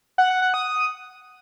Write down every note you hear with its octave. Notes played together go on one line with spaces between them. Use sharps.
F#5
F#5
F#5
D#6